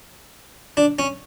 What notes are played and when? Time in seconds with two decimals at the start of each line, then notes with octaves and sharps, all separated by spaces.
0.77 D4
0.99 C#4